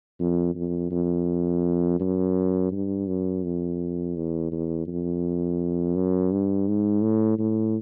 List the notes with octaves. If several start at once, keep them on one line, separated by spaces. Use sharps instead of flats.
F2
F2
F2
F#2
G2
F#2
F2
E2
E2
F2
F#2
G2
G#2
A2
A2